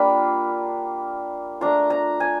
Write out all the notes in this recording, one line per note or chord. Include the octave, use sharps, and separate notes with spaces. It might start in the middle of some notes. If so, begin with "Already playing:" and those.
Already playing: G3 A#3 D4 F4 B5
A3 D4 F4 A#5
A#5
G#5